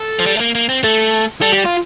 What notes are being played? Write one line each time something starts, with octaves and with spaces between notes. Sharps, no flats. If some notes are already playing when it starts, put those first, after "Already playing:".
Already playing: A4
F3
G3
A3
A#3
A#3
C4
A3 A4
G3 A4
G4
F4